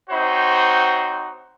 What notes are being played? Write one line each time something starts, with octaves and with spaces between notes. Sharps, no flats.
C4 D#4 F#4 C5 C#5